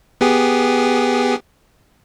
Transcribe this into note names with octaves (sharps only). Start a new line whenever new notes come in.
B3 G4 G#4